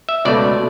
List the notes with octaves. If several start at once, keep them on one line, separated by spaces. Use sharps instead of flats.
E5
C#2 B2 A3 D5